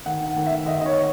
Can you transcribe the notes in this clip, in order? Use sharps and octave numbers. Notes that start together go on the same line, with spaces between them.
D#3 F#5
F#5
D#3
E5
D#3 D#5
D#5
C#5